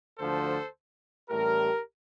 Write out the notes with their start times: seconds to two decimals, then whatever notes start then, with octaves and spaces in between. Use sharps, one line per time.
0.18 D2 D3 F3 A4 C5
1.30 A1 A2 G3 G4 A#4